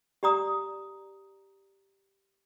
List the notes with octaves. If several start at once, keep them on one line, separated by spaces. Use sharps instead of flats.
G4 D5 A#5 D#6